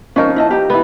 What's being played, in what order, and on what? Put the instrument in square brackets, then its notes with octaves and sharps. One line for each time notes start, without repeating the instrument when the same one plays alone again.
[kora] F3 D#4 A#4 [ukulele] C#4
[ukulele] E4 D#5 A5
G4 A#5
[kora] E3 B3